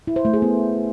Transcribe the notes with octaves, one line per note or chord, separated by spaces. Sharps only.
E4
C5
A3
G#4
B3